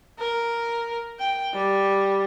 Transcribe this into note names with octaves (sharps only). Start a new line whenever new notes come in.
A#4
G5
G3